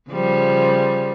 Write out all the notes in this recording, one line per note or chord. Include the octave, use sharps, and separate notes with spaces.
C#3 F3 G3